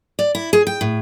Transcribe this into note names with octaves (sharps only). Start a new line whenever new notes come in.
D5
E4
G#4
G5
A2